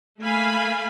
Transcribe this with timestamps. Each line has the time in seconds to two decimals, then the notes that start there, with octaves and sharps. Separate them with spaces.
0.20 A3 A#3 F5 G#5 B5